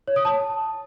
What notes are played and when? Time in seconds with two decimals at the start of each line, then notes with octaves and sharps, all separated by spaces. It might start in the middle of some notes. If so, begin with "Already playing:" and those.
0.08 C#5
0.16 D#6
0.25 A5